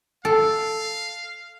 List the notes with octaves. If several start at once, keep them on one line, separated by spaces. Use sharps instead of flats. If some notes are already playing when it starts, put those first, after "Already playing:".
A4 F5